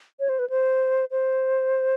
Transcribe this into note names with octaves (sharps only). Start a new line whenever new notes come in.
C#5
C5
B4
C5
C5